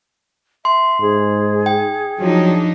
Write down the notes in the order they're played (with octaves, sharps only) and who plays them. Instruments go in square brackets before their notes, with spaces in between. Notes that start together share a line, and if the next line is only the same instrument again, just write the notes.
[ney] E5 [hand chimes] C6
[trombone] G#2 [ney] G#4
[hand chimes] G5
[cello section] F3 D4 D#4 [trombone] F#3